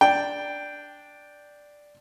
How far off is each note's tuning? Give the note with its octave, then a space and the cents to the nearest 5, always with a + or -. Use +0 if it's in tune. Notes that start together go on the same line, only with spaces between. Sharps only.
D4 +0 G5 +0